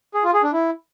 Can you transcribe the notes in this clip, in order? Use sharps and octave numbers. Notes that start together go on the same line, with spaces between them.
G#4
F4
G#4
D4
E4